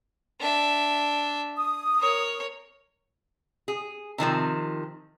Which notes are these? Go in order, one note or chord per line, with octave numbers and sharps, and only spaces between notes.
D4 E5
D#6
A#4 C#5
G#4
C3 D#3 F3 C4